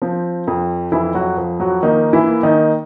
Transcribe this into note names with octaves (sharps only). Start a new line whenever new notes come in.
F3 C4
F2
F2 E3 E4
F#3 F#4
F3
F#3 F#4
D#3 A#3 D#4
E3 E4
A#3
D#3 D#4